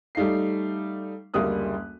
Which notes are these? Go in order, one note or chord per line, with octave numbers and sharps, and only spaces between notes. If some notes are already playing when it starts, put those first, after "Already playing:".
G3 A3 D#4 F5 C7
F#1 D2 G3 A#3 D#6 F#6